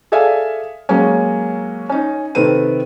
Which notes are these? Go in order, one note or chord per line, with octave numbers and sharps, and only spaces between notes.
G#4 A4 D5 E5 F5 G#5
F#3 G#3 A#3 C#4
C#4 D#4
C3 D#3 C4 A4 B4 D#7